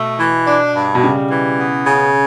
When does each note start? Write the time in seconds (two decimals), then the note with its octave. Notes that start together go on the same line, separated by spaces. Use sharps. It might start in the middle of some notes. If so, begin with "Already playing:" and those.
Already playing: B2 A3
0.19 E3
0.47 D4
0.75 G2
0.95 B2
1.02 C#3 G3
1.30 E3
1.58 B3
1.87 C#3